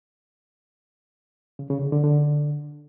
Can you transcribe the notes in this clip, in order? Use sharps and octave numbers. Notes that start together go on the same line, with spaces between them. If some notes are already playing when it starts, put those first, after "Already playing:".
C#3
C#3
D3
D3
D3